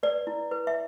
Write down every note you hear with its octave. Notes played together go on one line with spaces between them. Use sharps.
B4 D5
E4
B4
E5